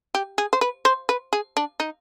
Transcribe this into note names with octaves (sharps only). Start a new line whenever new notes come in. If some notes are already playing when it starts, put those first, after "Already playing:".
G4
G#4
C5
B4
C5
B4
G#4
D4
D#4